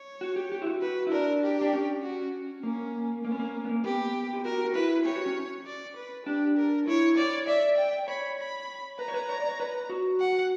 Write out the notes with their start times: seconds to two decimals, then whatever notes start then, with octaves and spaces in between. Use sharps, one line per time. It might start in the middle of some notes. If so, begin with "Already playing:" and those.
Already playing: C#5
0.21 F#4
0.36 G4
0.52 G4
0.62 E4
0.66 F#4
0.82 F#4 B4
1.07 E4
1.12 D4 A#4
1.43 G4
1.61 D4
1.73 C#4
2.03 F#4
2.63 A#3 C#4
3.25 A#3 C#4
3.32 B3
3.39 A#3
3.65 B3
3.69 A#3
3.84 B3 G4
4.33 G4
4.45 F#4 A#4
4.65 F#4
4.75 E4 B4
5.06 G4 C#5
5.16 F#4
5.26 C#4
5.66 D5
5.96 B4
6.26 D4 G4
6.58 A#4
6.87 E4 C#5
7.17 C#5 D5
7.47 D5 E5
7.78 G5
8.08 C#5 B5
8.39 B5
8.99 B4 A#5
9.08 C#5
9.14 B4
9.29 C#5
9.40 D5
9.49 C#5
9.60 B4
9.90 F#4
10.20 F#5